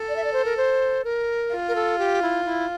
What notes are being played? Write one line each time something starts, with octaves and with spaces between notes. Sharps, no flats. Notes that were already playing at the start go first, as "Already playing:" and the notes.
Already playing: A4
D5
E5
D5
C5
A#4
C5
A#4
F4
A#4
A4
G4
E4
E4